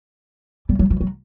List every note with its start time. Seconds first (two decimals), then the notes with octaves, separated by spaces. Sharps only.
0.69 G3
0.79 F#3
0.90 F3
1.01 F#3